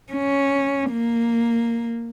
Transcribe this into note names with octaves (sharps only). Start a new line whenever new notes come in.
C#4
A#3